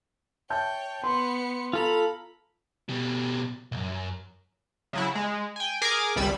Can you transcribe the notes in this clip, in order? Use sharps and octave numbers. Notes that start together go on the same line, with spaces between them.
C#5 E5 G5 A5 G6
B3 C6 C#7
F4 A4 A#5 B5
B2 G3
B1 F#2
C#3 F#3 E4
G#3
G5 G#5
G#4 A#4 G#5 D6
G#1 C#2 G3 B5 E6